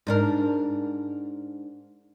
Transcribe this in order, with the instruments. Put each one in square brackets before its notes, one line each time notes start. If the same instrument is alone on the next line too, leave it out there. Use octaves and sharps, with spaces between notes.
[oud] G#2 D4 A#4